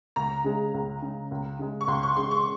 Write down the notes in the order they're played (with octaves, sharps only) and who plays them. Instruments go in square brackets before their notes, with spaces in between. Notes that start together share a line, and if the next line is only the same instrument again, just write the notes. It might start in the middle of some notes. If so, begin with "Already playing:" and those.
[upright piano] C#2 [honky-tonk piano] A#5
[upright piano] C#3 G#3
C#2
C#3 G#3
C#2
C#3 G#3
[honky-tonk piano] C#6
[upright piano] C#2 [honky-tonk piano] C6
[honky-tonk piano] C#6
[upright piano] C#3 G#3 [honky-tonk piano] C6
[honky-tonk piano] C#6